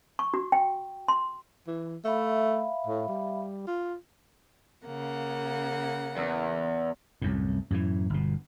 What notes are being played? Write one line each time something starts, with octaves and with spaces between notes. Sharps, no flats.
C#6
F#4
G5
C6
E3
A3 E5 F5 B5
A2
G3
F4
C#3 A#3 F#5
E2
C2 F#2 A2
F#2 A2 C#3 E3
G1 B2